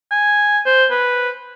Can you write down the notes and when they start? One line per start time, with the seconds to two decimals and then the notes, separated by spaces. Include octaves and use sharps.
0.11 G#5
0.66 C5
0.91 B4